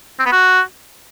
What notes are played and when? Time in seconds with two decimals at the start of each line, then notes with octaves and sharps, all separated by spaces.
0.19 C4
0.26 B3
0.32 F#4